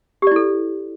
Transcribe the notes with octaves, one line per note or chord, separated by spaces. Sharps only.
E4 G4 A4 D5